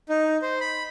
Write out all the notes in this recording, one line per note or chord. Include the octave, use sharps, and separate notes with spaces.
D#4
C5
B5